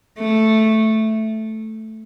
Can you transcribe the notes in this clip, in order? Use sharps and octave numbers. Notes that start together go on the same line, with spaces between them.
A3